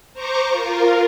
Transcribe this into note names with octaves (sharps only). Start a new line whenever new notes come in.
C5 A#5 C#6 D6
F4 A#4